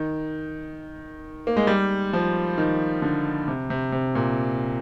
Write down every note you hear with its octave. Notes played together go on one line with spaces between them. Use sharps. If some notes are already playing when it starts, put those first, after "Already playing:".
Already playing: D#3
A#3
G#3
G3
F3
D#3
D3
C3
C3
C3
A#2